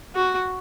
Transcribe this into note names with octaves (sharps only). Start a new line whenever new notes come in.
F#4